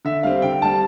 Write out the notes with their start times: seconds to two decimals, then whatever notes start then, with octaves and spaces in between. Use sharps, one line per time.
0.05 D3 E5
0.23 G3 C4 F5
0.42 D3 G5
0.62 G3 C4 A5